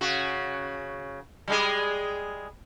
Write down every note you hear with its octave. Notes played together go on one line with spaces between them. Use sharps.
C#3 F#4
G3 G#3 G#4